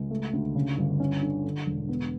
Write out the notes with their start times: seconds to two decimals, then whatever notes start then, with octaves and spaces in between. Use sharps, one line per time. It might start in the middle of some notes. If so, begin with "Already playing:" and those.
Already playing: C#2
0.11 A3
0.33 D2
0.55 C#3
0.77 G1
1.00 C#4
1.23 D3
1.45 D3
1.66 E1
1.89 B3